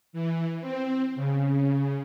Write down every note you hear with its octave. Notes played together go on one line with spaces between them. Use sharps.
E3
C4
C#3